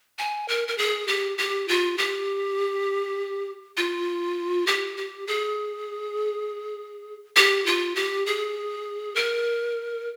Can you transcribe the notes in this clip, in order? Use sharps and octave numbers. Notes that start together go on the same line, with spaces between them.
G#5
A#4
A#4
G#4
G4
G4
F4
G4
F4
G4
G4
G#4
G4
F4
G4
G#4
A#4